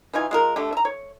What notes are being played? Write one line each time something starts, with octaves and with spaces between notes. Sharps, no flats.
E3 D#4 F4 G#5
G#3 F4 A#4
D3 A3 G4
E5 A#5
C#5